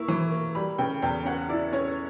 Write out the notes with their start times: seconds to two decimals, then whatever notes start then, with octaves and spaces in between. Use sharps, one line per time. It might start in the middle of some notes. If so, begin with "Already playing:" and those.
Already playing: A#3 E4 C#6
0.08 E3
0.32 A#3
0.55 G3 B5
0.78 C#3 G5
1.02 E2 G5
1.25 C#4 F#5
1.49 E4 D5
1.73 C#4 C#5